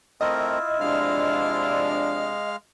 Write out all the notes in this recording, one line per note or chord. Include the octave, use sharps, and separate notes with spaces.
A3 C4 E4 F4 A#4 D#5
C3 F3 G#3 D4 F5 F6